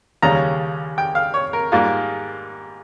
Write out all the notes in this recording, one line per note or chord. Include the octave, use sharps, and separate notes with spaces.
D#2 C#3 G3 C#4 A#5
G5
F5
C#5
A#4
G#2 G3 A#3 F4